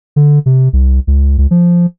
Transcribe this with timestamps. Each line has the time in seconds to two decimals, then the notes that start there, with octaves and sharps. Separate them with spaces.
0.16 D3
0.46 C3
0.73 C2
1.07 C#2
1.38 C#2
1.51 F3